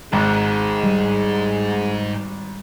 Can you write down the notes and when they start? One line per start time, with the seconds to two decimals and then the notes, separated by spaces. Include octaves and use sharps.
0.13 G#1 G#2 G#3
0.84 G3